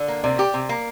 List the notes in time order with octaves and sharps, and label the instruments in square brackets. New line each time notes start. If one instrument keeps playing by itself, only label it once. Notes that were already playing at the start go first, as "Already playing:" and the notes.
Already playing: [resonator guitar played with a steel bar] D3
A#3
[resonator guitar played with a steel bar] C3 [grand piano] D5
[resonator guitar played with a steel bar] G4
C3
A#3